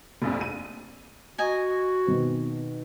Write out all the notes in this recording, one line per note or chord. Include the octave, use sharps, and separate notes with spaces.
F1 A#1 F2
D#7
F#4 D#5 G#5 A#5
B2 D#3 C4